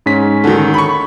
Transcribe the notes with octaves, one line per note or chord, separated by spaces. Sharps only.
G#2 C#4 B6
D3 D#3
B5 C#6